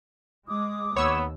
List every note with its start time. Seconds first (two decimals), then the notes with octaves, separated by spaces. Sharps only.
0.49 G#3 D6 D#6
0.97 D#2 B3 C#5 E6